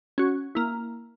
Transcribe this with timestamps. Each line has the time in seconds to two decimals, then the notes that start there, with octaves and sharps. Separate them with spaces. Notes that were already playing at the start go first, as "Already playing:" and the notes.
0.18 C#4 F#4
0.55 A#3 E4